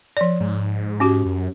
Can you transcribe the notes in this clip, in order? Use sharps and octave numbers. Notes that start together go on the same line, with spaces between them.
F3 D5
G#2
C#4 F#4 G4
F#2